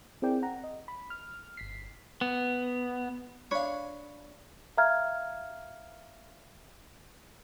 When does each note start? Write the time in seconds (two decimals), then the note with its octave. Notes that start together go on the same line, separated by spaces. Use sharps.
0.22 C4 E4 G#4 A#4 D5 G5
0.42 F#5 A#5
0.64 D#5
0.88 B5
1.10 F6
1.57 G1 B6 C7
2.21 B3
3.51 D4 C#5 F5 B5
4.77 E5 F5 A#5 F6 G#6